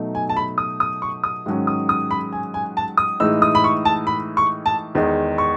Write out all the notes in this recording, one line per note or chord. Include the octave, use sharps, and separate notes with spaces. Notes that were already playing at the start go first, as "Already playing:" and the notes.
Already playing: B2 F#3 A3 D#4
G#5
A5
B5
D#6
D#6
C#6
D#6
G#2 D#3 F#3 C#4
D#6
D#6
B5
G#5
G#5
A5
D#6
A2 E3 G#3 D#4 E6
D#6
B5
C#6
A5
B5
C#6
A5
E2 D#3 G#3 D#4
C#6